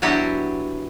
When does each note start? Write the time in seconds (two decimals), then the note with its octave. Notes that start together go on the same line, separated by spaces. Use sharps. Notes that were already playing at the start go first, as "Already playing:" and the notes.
0.02 F#3 B3 D4 E4 F#4 G4